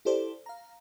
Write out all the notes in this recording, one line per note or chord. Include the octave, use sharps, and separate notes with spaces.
E4 G4 A4 C5 D5
F5 A#5